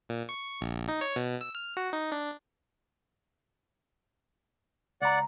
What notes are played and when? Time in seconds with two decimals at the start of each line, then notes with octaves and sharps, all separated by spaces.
0.09 A#2
0.29 C#6
0.61 A#1
0.88 D#4
1.01 C#5
1.16 B2
1.41 E6
1.55 F6
1.77 F#4
1.93 D#4
2.12 D4
5.02 C#2 D5 F#5 A#5